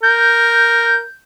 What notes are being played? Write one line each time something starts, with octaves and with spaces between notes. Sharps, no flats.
A#4 G6